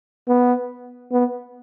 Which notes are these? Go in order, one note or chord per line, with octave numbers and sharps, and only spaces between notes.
B3
B3